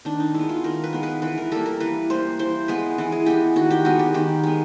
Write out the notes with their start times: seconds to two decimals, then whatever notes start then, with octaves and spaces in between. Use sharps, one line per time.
0.05 D#3 D4
0.20 D#4
0.34 G#3 B3 E4
0.49 F4
0.64 D#3 A#4
0.84 B4
0.93 G#3 B3
1.03 B4
1.22 E3 B4
1.38 A#4
1.52 G3 A#3 A4
1.66 A#4
1.80 E3 B4
2.10 G3 A#3 C5
2.39 E3 C5
2.68 G#3 B3 B4
2.98 E3
3.12 G#4
3.26 G#3 B3 G4
3.56 D#3 F#4
3.71 G4
3.85 G#3 B3 F#4
3.99 G4
4.14 D#3 G4
4.43 G#3 B3